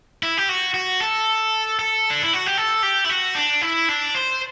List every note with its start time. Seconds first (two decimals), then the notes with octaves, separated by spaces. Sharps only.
0.23 E4
0.37 G4
0.49 F#4
0.74 F#4
1.01 A4
1.79 A4
2.10 D4
2.22 E4
2.33 F#4
2.46 G4
2.57 A4
2.83 G4
3.05 E4
3.10 F#4
3.35 D4
3.62 E4
3.89 D4
4.15 C5